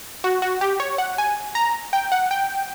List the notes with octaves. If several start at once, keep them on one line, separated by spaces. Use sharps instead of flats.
F#4
F#4
G4
C#5
F#5
G#5
A#5
G5
F#5
G5